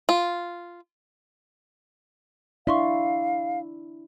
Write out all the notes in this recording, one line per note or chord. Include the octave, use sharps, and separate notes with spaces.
F4
D4 E4 D5 E5 F5 C6 C#6